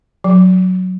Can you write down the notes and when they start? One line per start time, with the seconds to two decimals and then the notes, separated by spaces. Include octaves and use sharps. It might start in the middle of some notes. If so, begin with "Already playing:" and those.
0.24 F#3